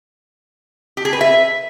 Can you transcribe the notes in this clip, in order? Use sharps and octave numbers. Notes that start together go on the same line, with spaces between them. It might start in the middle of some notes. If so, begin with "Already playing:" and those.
G4
G#4
B4
E5